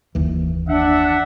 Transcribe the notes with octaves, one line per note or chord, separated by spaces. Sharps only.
F#1 D#2 E3
D4 E5 F#5